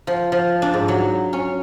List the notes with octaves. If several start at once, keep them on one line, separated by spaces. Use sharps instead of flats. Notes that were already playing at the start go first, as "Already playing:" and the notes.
F3
F3
D4
G#2
F#3
C#4